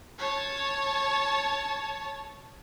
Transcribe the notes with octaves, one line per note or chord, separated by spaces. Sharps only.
C#5 A5